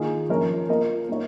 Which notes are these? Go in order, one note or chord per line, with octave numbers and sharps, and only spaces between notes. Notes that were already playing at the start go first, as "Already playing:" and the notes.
Already playing: D#3 A#3 F4 G#4
F3 A#3 C#4 A#4 C#5
A#3 F4 A#4 D#5
A#3 D#4 C#5